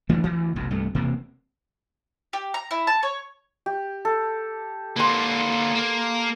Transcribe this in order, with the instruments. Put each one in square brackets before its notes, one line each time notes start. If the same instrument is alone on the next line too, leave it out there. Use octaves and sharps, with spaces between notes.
[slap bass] E3 A3 D4
D2 E3
F1 B1 F2
C2 G2 A3
E1 C3 A#3
[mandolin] G4
A#5
E4
A5
C#5
[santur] G4
A4
[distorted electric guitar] D3 A#3 [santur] B4 C6
[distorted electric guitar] A#3 A#4